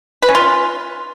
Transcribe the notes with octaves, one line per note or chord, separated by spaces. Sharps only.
B4
C#4
F4